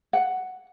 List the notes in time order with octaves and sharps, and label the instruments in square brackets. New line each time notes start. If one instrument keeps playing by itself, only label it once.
[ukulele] F#5